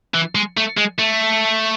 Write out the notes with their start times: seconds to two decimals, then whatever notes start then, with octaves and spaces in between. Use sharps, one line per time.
0.14 E3
0.35 G#3
0.57 A3
0.77 G#3
0.99 A3